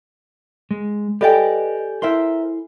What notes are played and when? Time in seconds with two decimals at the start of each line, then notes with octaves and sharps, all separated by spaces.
0.71 G#3
1.21 G4 A4 B4 D5 D#5 G5 G#5
2.02 E4 A#4 C5 E5 C6